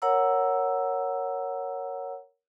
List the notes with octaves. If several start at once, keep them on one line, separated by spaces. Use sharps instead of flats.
A#4 C#5 F#5 A#5 E6